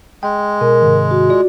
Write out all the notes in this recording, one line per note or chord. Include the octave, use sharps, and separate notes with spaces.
G#3 G5
B2 A#4
G#2 C3 D#3
F#4
F4 D5